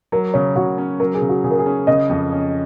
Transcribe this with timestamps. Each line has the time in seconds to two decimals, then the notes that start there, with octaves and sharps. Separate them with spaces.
0.12 F#3 A#4
0.34 C#3 C#5
0.56 C#3 F#4
0.78 C#4
1.00 F#3 A#4
1.14 G#4
1.22 C#3
1.29 F#4
1.44 C#3 G#4
1.51 A#4
1.59 G#4
1.66 C#4
1.87 C#3 D#5
2.10 F2
2.32 C#4